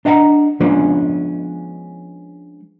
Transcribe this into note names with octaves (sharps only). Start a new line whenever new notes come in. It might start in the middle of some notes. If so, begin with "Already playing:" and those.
D4 D#5 F#5 G#5 A#5
F3 G#3 B3 C#4 D4